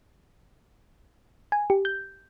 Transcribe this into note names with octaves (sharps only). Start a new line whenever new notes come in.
G#5
G4
G6